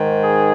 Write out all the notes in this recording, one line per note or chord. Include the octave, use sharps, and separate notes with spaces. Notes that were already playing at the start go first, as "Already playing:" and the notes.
Already playing: G#2 D#3
G#4